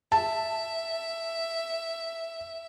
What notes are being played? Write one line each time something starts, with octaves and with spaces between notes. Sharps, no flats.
E5 A5